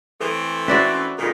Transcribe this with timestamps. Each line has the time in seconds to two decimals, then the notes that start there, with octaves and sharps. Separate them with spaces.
0.21 E3 A3 C4 A4
0.68 C#4 D#4 F#4 B4 C5 D5 E5
1.19 A#2 D#3 G#3 F4 A4